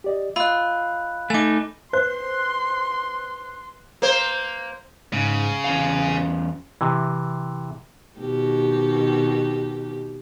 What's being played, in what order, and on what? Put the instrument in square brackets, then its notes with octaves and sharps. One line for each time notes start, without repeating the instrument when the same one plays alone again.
[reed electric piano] G4 D5 D#5
[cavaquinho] F4 [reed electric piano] D#5 E6 [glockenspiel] B5 F#6
[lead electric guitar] A3 D#4 [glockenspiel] G#5 D6
[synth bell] B4 F#6 [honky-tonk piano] C5 [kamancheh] C6
[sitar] A#3 C5
[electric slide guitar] G#2 [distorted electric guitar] C#3
[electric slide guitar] E2 C#4 F5
[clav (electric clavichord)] C3 E3
[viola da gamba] B2 D#3 G4